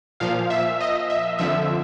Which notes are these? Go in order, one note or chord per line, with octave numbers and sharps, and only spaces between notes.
A#2 F3 F5
E5
D#5
E5
F2 D3 F3 E5